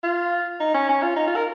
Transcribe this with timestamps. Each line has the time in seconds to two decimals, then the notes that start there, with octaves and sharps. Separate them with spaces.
0.03 F4
0.60 D#4
0.74 C#4
0.89 C#4
1.02 F4
1.16 D#4
1.27 F4
1.36 A#4